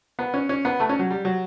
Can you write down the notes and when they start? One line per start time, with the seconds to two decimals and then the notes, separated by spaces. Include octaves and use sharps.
0.19 B3
0.34 C#4
0.49 C#4
0.65 B3
0.80 A3
0.89 C#4
0.99 F#3
1.10 G3
1.25 F#3